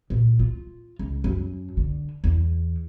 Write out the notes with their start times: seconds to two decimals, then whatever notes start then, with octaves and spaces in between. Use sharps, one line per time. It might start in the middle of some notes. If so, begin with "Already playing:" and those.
0.10 A#2
0.39 F4
0.99 C#2
1.24 F#2
1.77 D3
2.24 E2